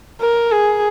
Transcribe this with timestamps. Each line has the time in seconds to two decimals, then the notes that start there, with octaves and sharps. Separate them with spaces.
0.21 A#4
0.52 G#4